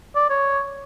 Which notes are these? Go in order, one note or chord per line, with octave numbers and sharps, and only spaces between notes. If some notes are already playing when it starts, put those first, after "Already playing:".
D5
C#5